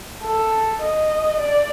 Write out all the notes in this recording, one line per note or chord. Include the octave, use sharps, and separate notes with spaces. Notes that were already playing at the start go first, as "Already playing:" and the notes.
A4
D#5
D5